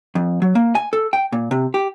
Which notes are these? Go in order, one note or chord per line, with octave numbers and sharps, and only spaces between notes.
F2
F#3
A#3
G#5
A4
G5
A#2
C3
G4